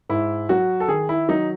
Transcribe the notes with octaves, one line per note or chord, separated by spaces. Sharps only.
G#2 E4
F#3 F#4
A4
D#3 G#4
E4
F#3 D#4